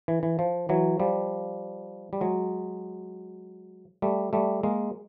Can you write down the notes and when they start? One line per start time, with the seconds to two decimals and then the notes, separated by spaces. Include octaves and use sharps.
0.08 E3
0.23 E3
0.39 F3
0.69 E3 F#3
1.00 F3 G3
2.13 G3
2.21 F#3 G#3
4.02 G3 A3
4.33 G3 A3
4.63 G#3 A#3